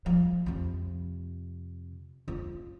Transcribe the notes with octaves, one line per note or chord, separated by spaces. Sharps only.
F3
F2 C3
F4